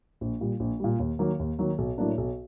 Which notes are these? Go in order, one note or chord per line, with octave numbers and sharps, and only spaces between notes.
A#1
A#2 G3
A#1
A#2 G3
D#2
D#3 F#3 A#3
D#2
D#3 F#3 A#3
B1
A2 F#3 A#3 D4
B1